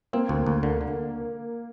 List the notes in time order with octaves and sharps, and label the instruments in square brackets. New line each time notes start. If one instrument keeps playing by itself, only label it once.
[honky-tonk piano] A#3 [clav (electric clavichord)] C4
[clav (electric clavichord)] D2
D2
D3
D3